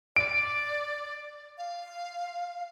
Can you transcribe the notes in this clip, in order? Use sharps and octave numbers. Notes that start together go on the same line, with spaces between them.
D5 D7
F5